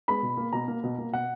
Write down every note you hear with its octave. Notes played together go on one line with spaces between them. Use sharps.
G#3 B3 B5
B2
A#3
B2 A#5
A#3
B2
A#3
B2 F#5